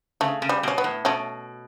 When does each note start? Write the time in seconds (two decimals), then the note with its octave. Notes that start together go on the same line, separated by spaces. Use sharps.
0.21 C#3 A3
0.42 C#3
0.49 G3
0.63 B2 C#4
0.78 B3
0.84 A2
1.05 B2 A3 C#4